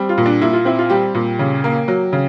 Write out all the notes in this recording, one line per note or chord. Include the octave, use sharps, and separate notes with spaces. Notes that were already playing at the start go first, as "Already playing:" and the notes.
Already playing: G3 C4
F4
A#2
D4
A#2 E4
F4
C4 E4
F4
G3 G4
A#2
C#3
A#3
F#3
C#3